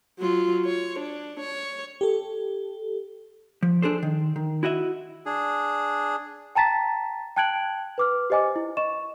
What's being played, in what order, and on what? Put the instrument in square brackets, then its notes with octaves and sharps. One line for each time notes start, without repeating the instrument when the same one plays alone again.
[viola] F#3 F4
C#5
D4
C#5
[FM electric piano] G4 A4
[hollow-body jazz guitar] F3
D4 G#4 A4 C5
D#3
D#3
E4 F#4 D#5 E5
[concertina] D4 G#4
[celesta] G5 A5 A#5 A6 B6
G5 A5 F#6 G#6 D7 F#7
B4 D6 F6
G4 C5 D#5 G#5 D6
E4
D#5 C#6 E7